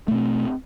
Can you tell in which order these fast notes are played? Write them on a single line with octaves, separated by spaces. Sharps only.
A3 B2 C4